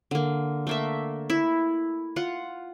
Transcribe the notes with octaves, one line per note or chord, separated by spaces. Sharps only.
D3 A#3
A3 A#3 E5
E4
F4 F#5